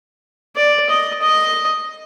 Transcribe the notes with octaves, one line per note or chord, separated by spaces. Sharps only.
D5
D#5
D#5